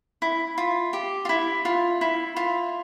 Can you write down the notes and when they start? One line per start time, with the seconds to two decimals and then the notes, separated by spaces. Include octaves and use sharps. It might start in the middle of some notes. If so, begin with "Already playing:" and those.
0.22 E4
0.58 F4
0.93 G4
1.25 F4
1.29 E4
1.65 F4
2.01 E4
2.36 F4